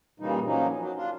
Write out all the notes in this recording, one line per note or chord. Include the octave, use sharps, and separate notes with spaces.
G2 A#2 C#3 E3 G3 D#4
F3 F#3 A#3 C#4 D#4
F#3
D4 F4